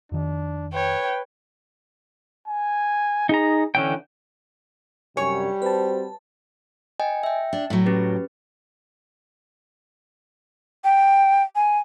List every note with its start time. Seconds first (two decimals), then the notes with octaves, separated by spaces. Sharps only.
0.12 F2 D#3 D4
0.74 B4 C#5 G5
2.47 G#5
3.29 D#4 G#4 A#5
3.75 D3 E3 C#4 G5
5.17 F#2 C3 G3 D4 C#5 G#5
5.62 C4 F#4 B4 C5 A5
7.00 D#5 G5 G#5
7.23 E5 G5
7.53 D4
7.70 A2 F#3
7.86 C#4 G4 B4
10.84 G5
11.56 G#5